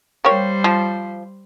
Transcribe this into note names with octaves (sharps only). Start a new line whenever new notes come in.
G3 A#3 G4 C5 C#5
F3